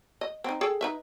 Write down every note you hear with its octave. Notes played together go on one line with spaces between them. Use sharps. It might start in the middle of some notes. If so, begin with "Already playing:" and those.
D#5
C4 D#4
G#4 A4 G5
D#4 B4 E5